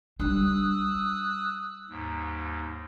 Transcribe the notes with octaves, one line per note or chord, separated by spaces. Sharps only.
G3 D4 D#6 E6 F#6
D#2 G#2